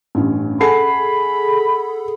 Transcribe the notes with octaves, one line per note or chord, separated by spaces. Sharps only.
A1 G2 C#4
G#4 A4 F#5 G#5 B5 C7